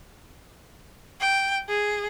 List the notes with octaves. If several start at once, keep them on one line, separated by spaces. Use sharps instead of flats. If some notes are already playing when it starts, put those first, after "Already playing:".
G5
G#4